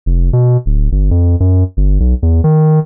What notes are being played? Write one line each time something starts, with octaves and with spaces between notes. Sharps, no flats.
F1
B2
D1
G1
F2
F#2
G1
B1
E2
D#3